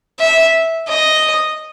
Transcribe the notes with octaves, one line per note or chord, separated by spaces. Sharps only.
E5
D#5